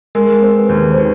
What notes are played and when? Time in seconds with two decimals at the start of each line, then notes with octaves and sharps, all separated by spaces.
0.15 G#3 A#4
0.42 C4
0.57 B4
0.69 D#2
0.92 C5
0.98 D#3 B4